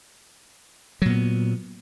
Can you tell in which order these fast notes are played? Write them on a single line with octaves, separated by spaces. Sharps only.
F#3 A#2 B3